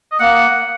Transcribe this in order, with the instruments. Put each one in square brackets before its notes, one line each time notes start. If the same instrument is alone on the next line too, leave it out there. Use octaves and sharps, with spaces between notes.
[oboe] D#5
[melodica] A#3 [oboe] F#5